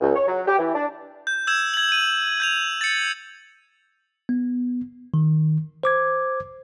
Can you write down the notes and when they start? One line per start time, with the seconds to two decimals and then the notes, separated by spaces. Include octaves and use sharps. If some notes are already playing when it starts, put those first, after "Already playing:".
0.01 C#2
0.15 C#5
0.27 F#3
0.46 G4
0.59 E3
0.75 D4
1.27 G6
1.47 E6 G6 G#6 E7
1.74 G#6 F#7
1.89 D#7 F#7
2.40 G6 G#6 F7
2.81 A6 C#7
4.29 B3
5.14 D#3
5.83 C5 D6 G#6